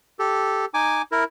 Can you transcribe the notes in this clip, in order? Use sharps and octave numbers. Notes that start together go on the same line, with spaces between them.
G4 A4
D#4 G#5 D6
E4 A#4